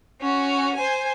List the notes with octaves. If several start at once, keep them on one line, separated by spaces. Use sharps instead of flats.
C#4 F#4
C5 G#5